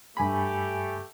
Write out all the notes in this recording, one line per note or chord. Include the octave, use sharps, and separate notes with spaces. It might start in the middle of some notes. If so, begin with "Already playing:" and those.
G2 A3 G4 G#5 B5